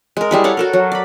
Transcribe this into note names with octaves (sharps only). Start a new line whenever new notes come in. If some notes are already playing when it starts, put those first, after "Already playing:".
G#3 A#4
G3 E4 G#4
A4 C#5 F5 F#5
F#4 A4 A#4
F#3
D5 B5